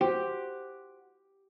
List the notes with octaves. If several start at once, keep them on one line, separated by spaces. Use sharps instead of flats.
F#4 G4 C5